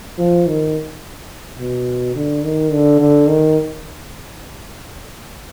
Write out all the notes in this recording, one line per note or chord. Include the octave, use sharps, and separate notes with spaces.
F3
D#3
B2
D3
D#3
D3
D3
D#3